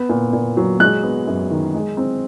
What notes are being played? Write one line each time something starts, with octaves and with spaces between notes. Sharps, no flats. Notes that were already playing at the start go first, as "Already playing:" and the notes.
Already playing: B3
A#2
A#2
F#3
G#3 F#6
B3
F#2
D#3
G#3
C4